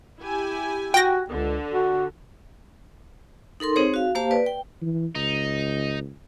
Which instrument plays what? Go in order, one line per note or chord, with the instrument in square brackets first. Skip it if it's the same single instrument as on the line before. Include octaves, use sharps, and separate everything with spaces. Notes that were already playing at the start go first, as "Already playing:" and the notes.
[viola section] E4 G4 G#5
[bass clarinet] F#4 [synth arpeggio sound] G5 A#6
[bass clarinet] C#2 [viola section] D3
[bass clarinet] F#4
[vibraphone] D#4 A4 A#4 C6
C4 D#4 G#4 C5 C#5
F#4 F5
A#3 G4 C5 F5 A5
B4 D5
G5
[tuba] E3
[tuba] C#2 [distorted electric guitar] D#4